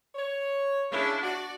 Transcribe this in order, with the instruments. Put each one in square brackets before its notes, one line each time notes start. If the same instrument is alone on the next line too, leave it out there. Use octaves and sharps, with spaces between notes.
[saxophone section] C#5
[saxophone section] C#3 [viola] D4 E4
[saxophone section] F#4 [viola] D5